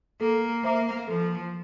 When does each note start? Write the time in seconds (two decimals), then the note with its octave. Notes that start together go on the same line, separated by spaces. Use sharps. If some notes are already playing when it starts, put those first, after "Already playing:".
0.21 A#3 A4
0.64 A#3 C5 E5 A#5 D6
1.08 F3 A4